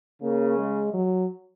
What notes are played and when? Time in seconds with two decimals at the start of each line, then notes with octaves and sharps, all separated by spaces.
0.23 C#3 A#3
0.58 G#3
0.93 F#3